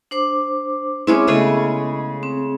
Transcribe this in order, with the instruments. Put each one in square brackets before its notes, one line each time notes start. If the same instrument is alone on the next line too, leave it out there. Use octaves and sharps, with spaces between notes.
[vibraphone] D4 C5 D6
[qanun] G#3 C#4 E4 [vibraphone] C4 C#5 D6
[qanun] C#3 G#3 A3 [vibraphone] B3 G#4 D#5
[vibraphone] C4